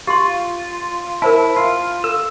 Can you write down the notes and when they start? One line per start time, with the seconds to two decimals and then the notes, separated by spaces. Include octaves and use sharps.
0.07 F4 G4 C6
1.22 E4 A#4 C5 A5
1.57 F4
2.04 A4 E6